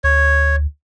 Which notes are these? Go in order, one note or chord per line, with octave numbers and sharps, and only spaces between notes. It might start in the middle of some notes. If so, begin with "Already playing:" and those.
D2 C#5